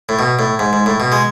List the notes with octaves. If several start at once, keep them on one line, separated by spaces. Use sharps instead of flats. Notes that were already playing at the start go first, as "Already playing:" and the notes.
A2
B2
A2
G#2
G#2
A2
B2
G#3